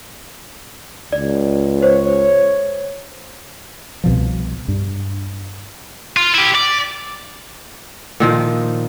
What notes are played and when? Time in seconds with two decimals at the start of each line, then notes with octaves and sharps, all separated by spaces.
1.12 C#2 D5
1.82 C5 C#5
4.04 C2 B2 F3
4.68 G2
6.17 F4
6.34 E4 G4
6.55 D5
8.20 A#2 D#3 F3